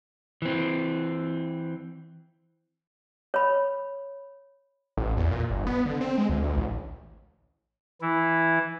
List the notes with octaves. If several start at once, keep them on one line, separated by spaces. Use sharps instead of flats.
E3 C4
C#5 B5
A1
E2
A#2
G1
B3
D3
C4
G#3
D2
D2
A1
E3 E4